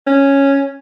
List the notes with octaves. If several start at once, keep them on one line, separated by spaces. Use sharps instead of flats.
C#4